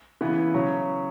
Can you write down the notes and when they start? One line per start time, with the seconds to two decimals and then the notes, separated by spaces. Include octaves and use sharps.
0.21 C#3 E3 B3 E4
0.54 C#3 F#3 C#4